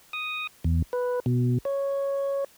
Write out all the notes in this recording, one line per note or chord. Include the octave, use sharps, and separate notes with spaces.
D#6
E2
B4
B2
C#5